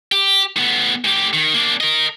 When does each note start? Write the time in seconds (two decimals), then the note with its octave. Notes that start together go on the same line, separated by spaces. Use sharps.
0.12 G4
0.56 A2 B3
1.05 A2 G4
1.33 D#3
1.54 A#3 D4
1.81 A#4 D#5